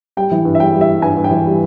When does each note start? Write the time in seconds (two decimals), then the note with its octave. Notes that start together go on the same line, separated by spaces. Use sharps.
0.17 G3 G5
0.31 E3
0.45 G2
0.55 E5
0.60 G3 G5
0.74 G3
0.81 E5
0.89 G3
1.02 G2 G#5
1.17 G2
1.24 G5
1.31 E3
1.46 G3